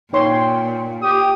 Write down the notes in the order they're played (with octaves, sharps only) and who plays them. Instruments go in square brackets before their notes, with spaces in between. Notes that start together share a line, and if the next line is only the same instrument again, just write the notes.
[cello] A#2 [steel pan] D#4 C#5 C6 [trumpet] G5
[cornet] G4 [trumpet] D#6